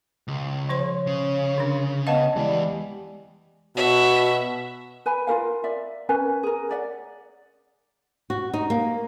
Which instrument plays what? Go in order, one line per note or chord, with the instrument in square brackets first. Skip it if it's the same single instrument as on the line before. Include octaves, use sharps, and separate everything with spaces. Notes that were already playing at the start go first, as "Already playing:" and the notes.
[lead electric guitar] C#2
[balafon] F3 C5 C6 [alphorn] C#5
[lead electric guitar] C#3
[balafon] D3 D4
[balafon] B3 B4 F5 [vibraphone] D#5 F#5 A5
[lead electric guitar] E2 E3 [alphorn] G3 [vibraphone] G#3 D5
[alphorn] B2 [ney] F#4 [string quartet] E5 F#5
[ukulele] B4 G#5 B5
F4 F#4 A#4 F5
D5 E5
C#4 A#4 B4 G#5
G#4 A#4
C#5 D5 E5 F#5
[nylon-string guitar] F#4
D#4
A#3